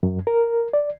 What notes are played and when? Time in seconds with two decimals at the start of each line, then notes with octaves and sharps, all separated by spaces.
0.03 F#2
0.27 A#4
0.73 D5